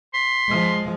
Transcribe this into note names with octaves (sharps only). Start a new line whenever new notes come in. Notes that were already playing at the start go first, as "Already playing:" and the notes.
C6 B6
F3 G#3